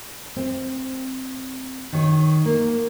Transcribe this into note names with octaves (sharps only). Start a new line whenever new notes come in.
C4
D#3 C#5
A#3